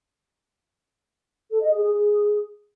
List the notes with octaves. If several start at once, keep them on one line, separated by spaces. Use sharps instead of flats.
A4
D#5
G#4
G#4
G#4